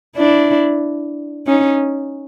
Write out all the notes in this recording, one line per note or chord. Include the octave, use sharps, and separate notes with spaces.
D4 E4
C#4 D#4